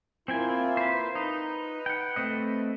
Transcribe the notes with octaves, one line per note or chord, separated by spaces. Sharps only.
A#3 C4 E4 F4 G5 G#5
B4 C5
D#4 B4
F#5 G5
A3 C4 D#5